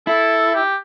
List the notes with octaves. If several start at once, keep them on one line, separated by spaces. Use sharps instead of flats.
E4 A4
G4